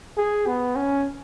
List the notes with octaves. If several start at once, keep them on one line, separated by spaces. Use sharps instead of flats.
G#4
B3
C#4